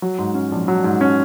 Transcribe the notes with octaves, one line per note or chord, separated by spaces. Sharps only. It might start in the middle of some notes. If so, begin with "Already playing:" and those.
F#3
G#2
C#4
A#1
F#3
G#2
C#4